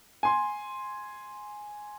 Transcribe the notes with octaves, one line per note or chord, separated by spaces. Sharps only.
G#5 C6